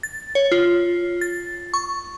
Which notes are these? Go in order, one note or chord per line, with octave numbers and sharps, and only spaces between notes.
A6
C#5
F4
A6
C#6